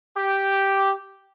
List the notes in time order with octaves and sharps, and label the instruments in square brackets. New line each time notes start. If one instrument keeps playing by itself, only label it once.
[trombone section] G4